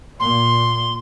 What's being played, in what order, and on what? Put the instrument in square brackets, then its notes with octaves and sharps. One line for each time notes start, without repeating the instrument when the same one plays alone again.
[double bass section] A#2 [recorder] C6